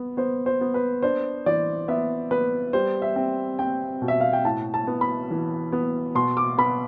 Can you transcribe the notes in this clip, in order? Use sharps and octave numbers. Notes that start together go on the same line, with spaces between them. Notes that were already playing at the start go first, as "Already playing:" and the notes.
Already playing: B3
B3 C5
C5
B3
B4
D4 C5
E3 D5
B3 E5
B3 B4
G3 C5
E5
C4
C4 G5
B2
E5
F5
G5
A2 A5
A5
B3
B5
E3
B3
B2 C6
D6
B3 B5